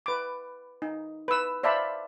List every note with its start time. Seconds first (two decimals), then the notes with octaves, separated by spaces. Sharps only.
0.06 B4 D6
0.82 D#4
1.28 B4 E6
1.63 C5 D5 E5 F5 A5 B5